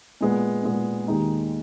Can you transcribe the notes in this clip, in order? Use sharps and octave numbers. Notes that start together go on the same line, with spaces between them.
A#2 G#3 B3
A#2 G#3 B3
D#2 D#3 G#3 D#4